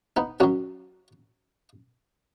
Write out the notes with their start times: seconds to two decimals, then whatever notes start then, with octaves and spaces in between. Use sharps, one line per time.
0.17 B3 D#4
0.40 F#2 F#3 C#4 F#4